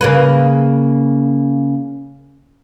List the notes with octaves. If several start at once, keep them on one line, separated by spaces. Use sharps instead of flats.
C#3 A#3 B4